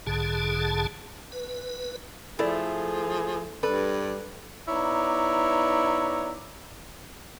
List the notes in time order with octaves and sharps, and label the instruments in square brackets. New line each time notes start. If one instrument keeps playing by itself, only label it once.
[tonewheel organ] B1 G#2 D3 G#4 A5
B4
[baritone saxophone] F3 [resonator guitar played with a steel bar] A3 [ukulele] E4 A4 D5 [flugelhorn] G#4
[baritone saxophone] G2 [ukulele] A4 [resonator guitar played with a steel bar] B4 [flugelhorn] D5
[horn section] B3 D#4 E4 C#5 D5 A#5